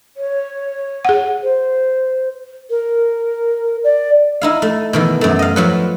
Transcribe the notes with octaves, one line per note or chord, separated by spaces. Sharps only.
C#5
G#4 F#5
C5
A#4
D5
D#4 E4 F5
A3
B2 D#3 E3
F#2 A3
D#5 F5
F3 F#3 B4